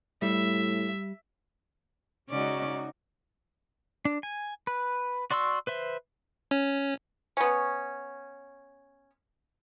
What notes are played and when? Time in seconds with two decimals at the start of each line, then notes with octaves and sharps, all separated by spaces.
0.22 A2 G3 E5
2.29 C#3 G#3 C#4 D#4 F#4 D5
4.05 D4
4.23 G#5
4.67 B4
5.31 F#4 D5 C6 C#6 E6
5.67 B4 C5 E5
6.51 C#4
7.37 B3 C#4